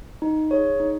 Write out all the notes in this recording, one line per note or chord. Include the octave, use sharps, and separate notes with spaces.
D#4
G#4 C#5
D#4